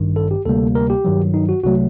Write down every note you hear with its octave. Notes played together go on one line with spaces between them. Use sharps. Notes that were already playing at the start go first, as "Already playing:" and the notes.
Already playing: A1 G2 D#3
A4
G4
D2 C3 G3 A#3 A4
A#4
G4
G2 D#3 F#3
D#4
F#4
C2 C3 F#3 A3 F#4